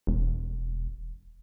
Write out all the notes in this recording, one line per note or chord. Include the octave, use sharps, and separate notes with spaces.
E1